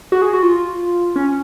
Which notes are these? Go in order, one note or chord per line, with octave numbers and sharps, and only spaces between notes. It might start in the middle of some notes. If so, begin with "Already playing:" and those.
F#4
G#4
F#4
F4
C#4